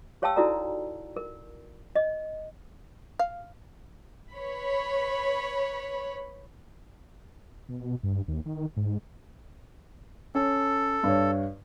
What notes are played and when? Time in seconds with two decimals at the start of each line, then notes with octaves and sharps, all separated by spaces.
0.22 G4 C#5 F5 G5 A5 E6
0.36 D#4 E4 F#4 A4 D5 A#5
1.17 A#4
1.96 D#5
3.19 F5
4.35 B4 C#5 B5
7.69 B2
8.03 G2
8.28 D#2
8.46 D#3
8.77 G#2
10.35 C#4 A4
11.03 G2 C#5